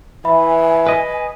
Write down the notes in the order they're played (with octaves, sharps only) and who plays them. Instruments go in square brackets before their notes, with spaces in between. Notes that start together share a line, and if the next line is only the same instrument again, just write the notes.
[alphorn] E3 [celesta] E5 B5 [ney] G#5
[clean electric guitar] B4 D#5